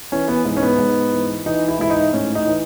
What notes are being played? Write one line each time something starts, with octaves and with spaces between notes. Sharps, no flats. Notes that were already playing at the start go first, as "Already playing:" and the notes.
E3 C#4
B3
G#2
C#4
B3
G#2
E3
E3 D#4
E4
G#2 E4
D#4
A2 C#4
D#4
E3